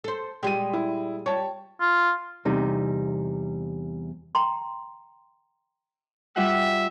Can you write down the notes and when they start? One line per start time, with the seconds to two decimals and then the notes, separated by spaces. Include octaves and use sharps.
0.04 A4 C5
0.43 A#2 G3 G#3 G4 D#7
0.73 E4
1.26 G3 C#5 A5
1.81 F4
2.45 E2 C3 G3 D#4
4.35 G5 A#5 C6
6.36 G3 F4 E5 F#5